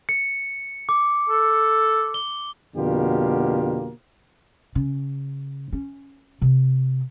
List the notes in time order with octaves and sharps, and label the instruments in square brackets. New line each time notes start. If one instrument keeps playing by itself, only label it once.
[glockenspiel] C#7
D6
[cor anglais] A4
[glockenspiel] G7
[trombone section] F2 B2 D3 A#3 F4 G4
[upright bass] C#3
C#4
C3